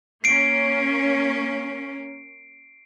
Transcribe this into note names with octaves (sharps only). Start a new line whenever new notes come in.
A#3 C#4 C7 D7